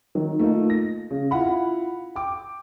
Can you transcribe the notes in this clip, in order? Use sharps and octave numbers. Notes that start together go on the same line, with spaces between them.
D#3 F#3
A3 A#3 D#4 F4
A#6
C#3
E4 F4 F5 F#5 B5
G5 D6